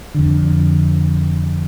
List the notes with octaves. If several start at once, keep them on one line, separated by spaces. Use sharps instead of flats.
F2 D3